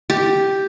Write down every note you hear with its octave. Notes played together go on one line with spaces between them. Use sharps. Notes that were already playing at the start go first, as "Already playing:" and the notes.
G4